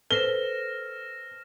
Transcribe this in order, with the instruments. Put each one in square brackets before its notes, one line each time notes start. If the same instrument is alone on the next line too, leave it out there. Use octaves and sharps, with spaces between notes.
[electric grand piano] A4 [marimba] B4 C5 [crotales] F6 A#6 E7 [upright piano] G7